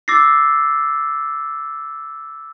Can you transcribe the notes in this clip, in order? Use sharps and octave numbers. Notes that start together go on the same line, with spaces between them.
D6 E6 A6 A#6 C7